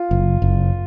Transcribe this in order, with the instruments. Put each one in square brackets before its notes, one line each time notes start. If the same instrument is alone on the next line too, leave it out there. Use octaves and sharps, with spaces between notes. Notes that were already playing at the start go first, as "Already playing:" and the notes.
Already playing: [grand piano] F4
[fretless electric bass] F#1
F#1